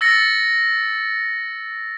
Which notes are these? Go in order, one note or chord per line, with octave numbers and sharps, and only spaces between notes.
E6 A6 A#6 C#7